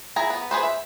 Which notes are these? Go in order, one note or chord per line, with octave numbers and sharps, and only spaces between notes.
E4 G#4 A#5
B3
G#4 B4 C5
E5